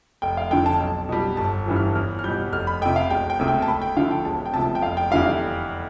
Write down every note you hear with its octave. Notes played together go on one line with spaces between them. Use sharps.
F1 G5
F5
F2 D3 G5
A5
B1
B2 G3
G1 A5
G2 E3 G3
F6
E2 F6
F6
B2 G3 G6
F1 F6
B5
F2 C3 G5
F5
E1 G5
G5
D2 C3
G5
A5
D2 B5
G5
D3 F3 F5
G5
E1 A5
G5
D2 C3 F3 A5
G5
F1 F5
G5
E2 D3 G3 F5
F5